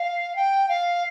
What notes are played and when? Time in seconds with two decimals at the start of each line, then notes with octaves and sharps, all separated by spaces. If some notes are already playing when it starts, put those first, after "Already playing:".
Already playing: F5
0.36 G5
0.69 F5